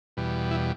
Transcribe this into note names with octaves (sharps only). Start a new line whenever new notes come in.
E2 B2 G3
E4